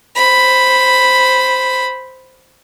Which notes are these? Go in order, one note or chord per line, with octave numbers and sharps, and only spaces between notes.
C5 B5